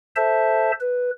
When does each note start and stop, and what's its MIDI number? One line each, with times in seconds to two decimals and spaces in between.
0.16 0.72 69
0.16 0.72 72
0.16 0.72 76
0.16 0.72 81
0.80 1.10 71